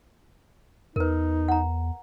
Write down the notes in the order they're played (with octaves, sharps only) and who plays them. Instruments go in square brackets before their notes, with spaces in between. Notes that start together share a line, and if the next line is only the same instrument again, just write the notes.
[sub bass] E2 [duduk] D#4 [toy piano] A#4 B4
[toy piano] F#5 A#5